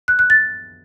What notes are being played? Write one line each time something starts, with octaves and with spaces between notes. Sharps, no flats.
F#6
F#6
A6